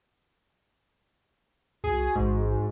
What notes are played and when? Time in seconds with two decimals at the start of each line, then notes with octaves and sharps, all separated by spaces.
1.84 C2 F#4 G#4
2.16 A1 G#2